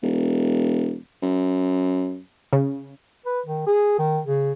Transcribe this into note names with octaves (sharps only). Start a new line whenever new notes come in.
E1
F#2
C#3
B4
D#3
G#4
D#3
C#3